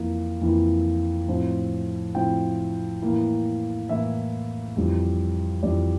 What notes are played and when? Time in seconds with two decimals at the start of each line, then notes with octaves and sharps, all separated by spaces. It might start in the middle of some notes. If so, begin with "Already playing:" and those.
Already playing: F2 E3 A#3 E4
0.41 F2 E3 A#3 E4
1.28 A2 F3 C4 E4
2.15 A2 F3 C4 E4 G5
3.02 A2 E3 A#3 E4
3.89 A2 E3 A#3 E4 E5
4.76 F2 E3 G3
5.63 F2 E3 G3 D5